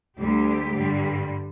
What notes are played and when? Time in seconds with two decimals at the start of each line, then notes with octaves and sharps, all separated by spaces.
0.17 D2 D3 G3 G4
0.72 G2 D3 G3